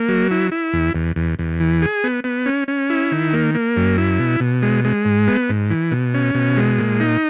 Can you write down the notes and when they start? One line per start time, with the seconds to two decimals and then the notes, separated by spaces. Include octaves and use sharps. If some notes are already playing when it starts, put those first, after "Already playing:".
Already playing: A#3
0.09 F#3
0.31 E4
0.52 E4
0.73 E2
0.95 E2
1.16 E2
1.39 E2
1.60 E3
1.82 G#4
2.04 B3
2.24 B3
2.46 C#4
2.68 C#4
2.90 E4
3.12 D#3
3.33 A#3
3.55 A#3
3.77 F#2
3.98 E4
4.19 B2
4.40 B2
4.62 G#3
4.85 G#3
5.05 G#2
5.28 B3
5.49 G#2
5.70 E3
5.92 B2
6.14 C#4
6.35 B2
6.57 G#3
6.79 A#2
7.00 D#4